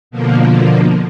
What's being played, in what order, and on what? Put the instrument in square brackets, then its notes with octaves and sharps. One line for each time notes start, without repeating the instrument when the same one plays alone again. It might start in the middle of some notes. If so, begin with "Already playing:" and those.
[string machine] B2 D3 F3 A#3